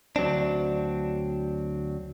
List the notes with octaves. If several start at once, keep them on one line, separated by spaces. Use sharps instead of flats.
D2 F#3 C4 D4